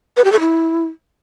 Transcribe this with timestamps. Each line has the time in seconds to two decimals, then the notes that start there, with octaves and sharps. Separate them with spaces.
0.17 B4
0.24 G4
0.32 A4
0.40 E4